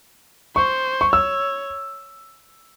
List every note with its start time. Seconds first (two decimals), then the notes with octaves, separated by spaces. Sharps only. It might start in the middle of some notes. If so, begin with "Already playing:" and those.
0.56 C5 C#6
1.01 C#6
1.13 C#5 E6